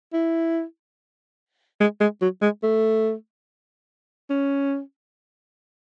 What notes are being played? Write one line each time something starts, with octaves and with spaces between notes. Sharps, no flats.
E4
G#3
G#3
F#3
G#3
A3
C#4